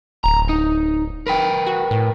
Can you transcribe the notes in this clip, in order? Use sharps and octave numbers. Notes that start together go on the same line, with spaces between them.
D1 A#5
D#4
A#4 B4 G5
F#4
A2